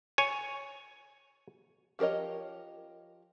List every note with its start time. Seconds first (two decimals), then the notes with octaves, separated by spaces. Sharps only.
0.18 C#5 G#5
1.99 F3 G4 A#4 C#5 D#5